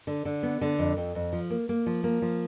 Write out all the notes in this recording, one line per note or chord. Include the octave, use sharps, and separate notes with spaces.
D3
D3
B3
D3
F2
F2
F2
F3
A#3
A#3
F3
A#3
F3